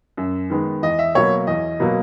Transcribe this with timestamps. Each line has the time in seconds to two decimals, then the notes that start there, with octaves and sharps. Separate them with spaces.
0.17 F#2
0.50 D#3 G#3 B3
0.82 E2 D#5
0.99 E5
1.15 B2 F#3 A#3 C#5
1.47 E2 D#5
1.80 B2 F#3 A#3